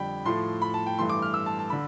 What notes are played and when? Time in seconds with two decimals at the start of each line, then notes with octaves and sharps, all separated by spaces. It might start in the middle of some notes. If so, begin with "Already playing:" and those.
Already playing: F2 D3 G3 G5 B5
0.25 A2 F3 A3 C6
0.62 B5
0.74 A5
0.86 G5
0.98 G2 E3 A3 C6
1.09 D6
1.22 F6
1.34 E6
1.46 A5
1.59 A5
1.70 D3 B5